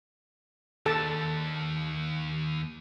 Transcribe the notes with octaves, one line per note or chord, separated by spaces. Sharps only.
D#2 A4 A5